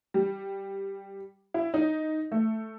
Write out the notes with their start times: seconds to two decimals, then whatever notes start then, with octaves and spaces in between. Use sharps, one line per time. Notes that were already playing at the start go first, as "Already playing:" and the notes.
0.14 G3
1.54 E4
1.74 D#4
2.32 A3